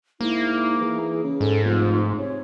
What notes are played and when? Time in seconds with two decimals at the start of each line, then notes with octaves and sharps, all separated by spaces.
0.21 G#2 A#3 E4
0.80 E3 G#4
1.24 C#3
1.41 G#2 A4
1.65 F1 F4
2.18 C3 C#5